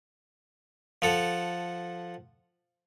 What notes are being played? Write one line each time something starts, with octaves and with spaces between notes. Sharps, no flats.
F3 A4 F#5